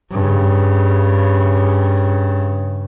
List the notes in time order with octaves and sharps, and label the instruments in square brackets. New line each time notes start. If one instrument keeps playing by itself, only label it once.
[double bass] G2 C#3